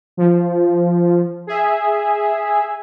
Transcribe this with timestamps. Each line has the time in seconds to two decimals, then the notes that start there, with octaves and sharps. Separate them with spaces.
0.17 F3
1.47 G#4 E5